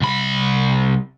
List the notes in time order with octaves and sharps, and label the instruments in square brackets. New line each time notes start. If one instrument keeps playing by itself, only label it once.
[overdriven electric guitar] C2 B5